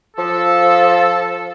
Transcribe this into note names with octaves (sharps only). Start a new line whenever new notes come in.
F3 A4